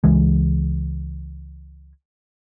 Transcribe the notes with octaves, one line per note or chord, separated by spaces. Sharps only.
C#2 E3 G#3